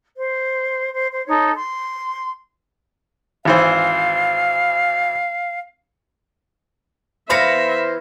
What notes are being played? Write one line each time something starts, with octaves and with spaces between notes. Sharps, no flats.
C5
C5
C5
D#4 A4 C#5
C6
G#1 E3 C5 F5
E3 B3 C5 E5 F5 B5 A#6 C#7